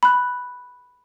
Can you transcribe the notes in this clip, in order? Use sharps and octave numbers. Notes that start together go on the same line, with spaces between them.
B5 F#6